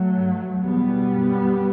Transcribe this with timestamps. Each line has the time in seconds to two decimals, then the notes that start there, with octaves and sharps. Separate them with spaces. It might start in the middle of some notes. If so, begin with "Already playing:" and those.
Already playing: F#3 A3
0.15 G2
0.62 E2 B2 G3 B3
1.10 F#2